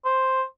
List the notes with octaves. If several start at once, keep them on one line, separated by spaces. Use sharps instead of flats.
C5